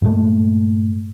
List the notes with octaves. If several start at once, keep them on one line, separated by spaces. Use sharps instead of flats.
G2 A#2 G#3 A3